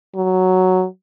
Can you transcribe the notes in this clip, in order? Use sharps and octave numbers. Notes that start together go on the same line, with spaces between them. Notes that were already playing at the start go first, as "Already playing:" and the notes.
F#3